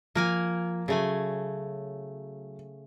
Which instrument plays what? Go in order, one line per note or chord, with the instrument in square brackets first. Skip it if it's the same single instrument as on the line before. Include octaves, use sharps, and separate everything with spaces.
[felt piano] F3 [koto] A#3 A#4 G#5
[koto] C#3 A3 G#5 [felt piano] F#3